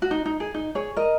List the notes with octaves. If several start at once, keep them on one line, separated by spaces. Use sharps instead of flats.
F#4
D#4
D#4
G#4
D#4
G#4 C#5
A#4 D#5